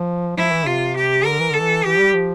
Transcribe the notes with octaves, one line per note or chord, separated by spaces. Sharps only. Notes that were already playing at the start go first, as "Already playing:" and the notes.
Already playing: F3
F3 E4
E3
C3 F4
G4
D3 A#4
E3
D3 A4
E3
E3 G4
G3
F3